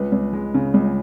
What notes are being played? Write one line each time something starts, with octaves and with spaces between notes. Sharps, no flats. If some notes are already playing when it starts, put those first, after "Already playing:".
Already playing: C#2 B4
C#2
G#3
C#3
C#2